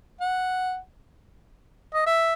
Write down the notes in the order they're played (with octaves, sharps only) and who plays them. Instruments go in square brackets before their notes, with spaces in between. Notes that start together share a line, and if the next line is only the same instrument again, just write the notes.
[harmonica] F#5
D#5
E5